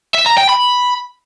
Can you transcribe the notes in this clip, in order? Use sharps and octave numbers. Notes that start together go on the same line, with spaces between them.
E5
A#5
G5
B5